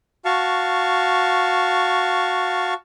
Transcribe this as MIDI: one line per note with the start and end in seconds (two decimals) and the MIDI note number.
0.25 2.74 66
0.25 2.74 77
0.25 2.74 81
0.25 2.74 85